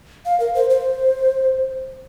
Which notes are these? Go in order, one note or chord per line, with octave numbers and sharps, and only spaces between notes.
F5
A#4
C5
C5